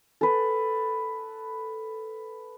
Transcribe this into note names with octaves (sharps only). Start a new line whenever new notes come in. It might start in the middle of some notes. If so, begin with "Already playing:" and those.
A4 B4